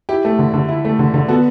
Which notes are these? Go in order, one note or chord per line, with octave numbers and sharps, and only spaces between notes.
E4 G4
A3
D3
D3
E4
A3
D3
D3
B3 F#4 A4